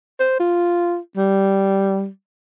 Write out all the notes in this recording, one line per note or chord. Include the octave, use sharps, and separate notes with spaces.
C5
F4
G3